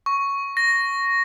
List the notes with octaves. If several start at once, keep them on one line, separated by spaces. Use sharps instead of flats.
C#6
A#6